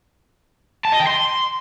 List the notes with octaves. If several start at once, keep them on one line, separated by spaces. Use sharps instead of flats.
A5
D#5
G5
C6